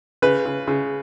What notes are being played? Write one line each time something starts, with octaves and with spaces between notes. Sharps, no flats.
C#3 B4
C#3
C#3